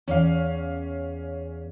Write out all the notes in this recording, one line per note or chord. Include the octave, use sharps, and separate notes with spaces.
E2 C#4 F5